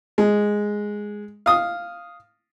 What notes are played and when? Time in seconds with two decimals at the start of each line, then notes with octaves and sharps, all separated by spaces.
0.18 G#3
1.46 F5 D#6